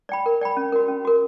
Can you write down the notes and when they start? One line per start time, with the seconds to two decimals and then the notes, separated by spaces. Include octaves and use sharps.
0.09 D5 G5 B5
0.26 A#4
0.41 D5 G5 B5
0.57 C#4
0.72 F#4 A#4
0.88 C#4
1.05 F#4 A#4